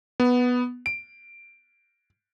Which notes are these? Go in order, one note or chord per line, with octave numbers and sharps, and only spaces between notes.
B3
D7